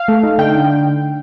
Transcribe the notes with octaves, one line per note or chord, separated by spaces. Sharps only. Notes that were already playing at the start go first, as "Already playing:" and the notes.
Already playing: F5
A3
D#4
D3 G5
D3